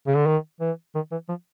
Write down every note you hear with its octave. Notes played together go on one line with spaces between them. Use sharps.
C#3
D3
D#3
E3
D#3
E3
F3